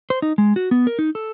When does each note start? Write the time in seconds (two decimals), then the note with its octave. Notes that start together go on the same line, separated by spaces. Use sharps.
0.10 C5
0.22 D#4
0.38 G#3
0.56 F#4
0.71 B3
0.87 A#4
0.99 D#4
1.15 A4